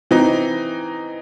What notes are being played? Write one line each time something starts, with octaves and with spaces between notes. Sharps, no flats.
E3 C4 D#4